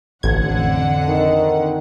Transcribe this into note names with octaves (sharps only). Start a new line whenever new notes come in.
A1 F2 D3 F#5 G#6
D#3